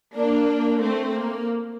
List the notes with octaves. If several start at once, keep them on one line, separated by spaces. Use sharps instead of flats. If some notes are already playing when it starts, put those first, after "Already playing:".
A#3 D4
A3 C4
A#3